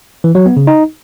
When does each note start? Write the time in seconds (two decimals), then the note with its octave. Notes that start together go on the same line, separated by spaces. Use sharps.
0.24 E3
0.35 F#3
0.46 B3
0.57 C#3
0.67 D#4